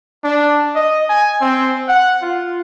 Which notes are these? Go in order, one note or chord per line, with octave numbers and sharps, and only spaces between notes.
D4
D#5
G#5
C4
F#5
F4